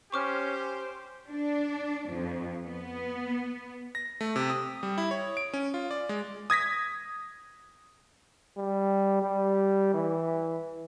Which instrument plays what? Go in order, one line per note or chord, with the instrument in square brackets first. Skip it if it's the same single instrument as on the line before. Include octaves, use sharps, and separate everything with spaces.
[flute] C#4 [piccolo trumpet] G4 [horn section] C5 [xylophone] C#6 D6 F6
[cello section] D4
F2
B3
[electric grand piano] A#6
A3
C3
D#6
G3
E4
C#5
D7
C#4
F4
D5
G#3
D#6 G#6 A#6 B6
[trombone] G3
G3
E3